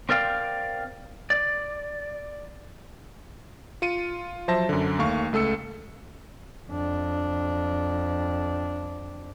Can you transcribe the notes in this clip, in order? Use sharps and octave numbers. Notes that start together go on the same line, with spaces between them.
C4 A#4 D5 F5 G5
D5
F4 C#7 D#7
F3 F#3 C5 E5 A5 A#6
F#2 D3
D#2 A3 F5 C#6
C#2 A3 A4 E6 C#7
F2 D4